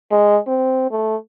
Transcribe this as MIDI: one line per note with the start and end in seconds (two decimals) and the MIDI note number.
0.11 0.38 56
0.47 0.87 60
0.91 1.16 57